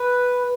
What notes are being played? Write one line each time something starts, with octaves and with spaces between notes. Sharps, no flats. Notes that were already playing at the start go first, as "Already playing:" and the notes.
Already playing: B4